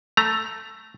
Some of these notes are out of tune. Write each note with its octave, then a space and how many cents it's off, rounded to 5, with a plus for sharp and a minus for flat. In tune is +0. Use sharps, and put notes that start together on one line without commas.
A3 +0 A#5 +10